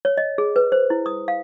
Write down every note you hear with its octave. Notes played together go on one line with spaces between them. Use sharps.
C#5
D#5
G#4
B4
C5
E4
D#6
F5